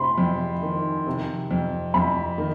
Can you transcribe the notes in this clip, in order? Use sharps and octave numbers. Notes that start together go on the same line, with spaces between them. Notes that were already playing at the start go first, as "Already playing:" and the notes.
Already playing: C3 B5 C6
F2
D#3
C3
F2
F2 B5
D#3